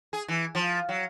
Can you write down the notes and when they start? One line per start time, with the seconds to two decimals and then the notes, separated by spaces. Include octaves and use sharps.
0.13 G#4
0.28 E3
0.55 F3
0.89 F#3